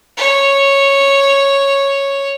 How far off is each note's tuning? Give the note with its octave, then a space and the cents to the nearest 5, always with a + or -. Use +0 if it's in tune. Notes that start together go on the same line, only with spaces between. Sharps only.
C#5 -5